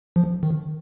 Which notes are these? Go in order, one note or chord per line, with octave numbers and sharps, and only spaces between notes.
F3
D#3